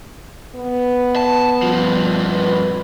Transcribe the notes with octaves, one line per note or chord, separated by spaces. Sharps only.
B3
A5
G2 F3
B4